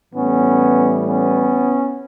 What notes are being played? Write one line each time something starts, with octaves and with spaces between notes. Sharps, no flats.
A2 E3 G3 B3 C#4
B3 C#4